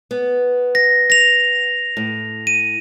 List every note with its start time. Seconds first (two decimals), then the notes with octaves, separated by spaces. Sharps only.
0.11 B3
0.75 A#6
1.10 A#6 F7
1.97 A2
2.47 D#7